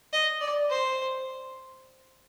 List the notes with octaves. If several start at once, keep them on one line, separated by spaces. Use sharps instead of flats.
D#5
D5
C5